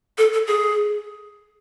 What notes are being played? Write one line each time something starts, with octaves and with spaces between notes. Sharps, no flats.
A4
A4
G#4